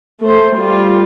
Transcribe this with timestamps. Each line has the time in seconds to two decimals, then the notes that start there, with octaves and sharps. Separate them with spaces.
0.22 A3 C5
0.58 G3 F4